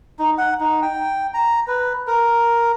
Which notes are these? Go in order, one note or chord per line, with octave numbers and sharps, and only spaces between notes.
D#4
F#5
D#4
G5
A#5
B4
A#4